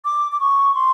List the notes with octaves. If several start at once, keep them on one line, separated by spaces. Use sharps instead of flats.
D6
D6
C#6
C6